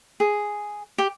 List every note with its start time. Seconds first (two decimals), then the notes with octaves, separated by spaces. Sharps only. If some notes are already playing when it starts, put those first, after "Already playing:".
0.20 G#4
0.98 G4